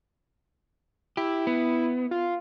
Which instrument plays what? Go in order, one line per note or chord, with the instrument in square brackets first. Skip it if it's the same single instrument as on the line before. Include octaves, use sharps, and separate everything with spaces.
[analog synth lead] E4 [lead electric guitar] G4
[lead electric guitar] B3
[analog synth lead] F4